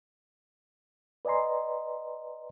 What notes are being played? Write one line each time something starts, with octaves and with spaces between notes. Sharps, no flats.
B4 D5 D#5 G#5 A#5 C6